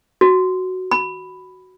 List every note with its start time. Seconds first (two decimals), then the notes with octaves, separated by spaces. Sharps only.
0.21 F#4
0.91 B5